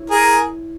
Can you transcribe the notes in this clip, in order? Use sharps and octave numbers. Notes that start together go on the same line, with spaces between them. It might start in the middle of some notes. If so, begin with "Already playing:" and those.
Already playing: E4 C#5
G#4 A#4